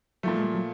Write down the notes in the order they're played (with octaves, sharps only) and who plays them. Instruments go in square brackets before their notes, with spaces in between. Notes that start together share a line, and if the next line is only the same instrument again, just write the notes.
[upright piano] A#2 F3 A3 [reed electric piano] F#3
[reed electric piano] G#3
G3
F#3